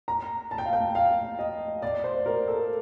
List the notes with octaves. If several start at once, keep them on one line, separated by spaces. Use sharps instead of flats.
A#5
A5
G5
F5
G5
F5
D#5
D5
C5
A#4
A4